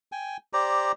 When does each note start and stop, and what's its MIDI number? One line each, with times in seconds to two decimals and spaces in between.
0.12 0.37 79
0.12 0.37 80
0.53 0.92 67
0.53 0.92 72
0.53 0.92 74
0.53 0.92 82